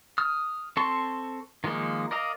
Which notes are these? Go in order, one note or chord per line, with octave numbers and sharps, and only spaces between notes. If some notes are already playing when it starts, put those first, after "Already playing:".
D#6 F6
C4 A4 A5 C6 C#6
D#3 F3 G#3 A#3 D#4
A#4 D5 D#5 F5 A#5